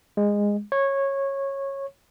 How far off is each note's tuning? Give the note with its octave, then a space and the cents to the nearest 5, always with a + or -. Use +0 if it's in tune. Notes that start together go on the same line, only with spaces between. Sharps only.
G#3 -15
C#5 -15